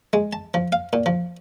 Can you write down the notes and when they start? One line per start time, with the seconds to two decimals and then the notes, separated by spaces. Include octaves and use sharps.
0.13 G#3
0.33 A5
0.54 F3
0.72 F5
0.93 A#2
1.06 F3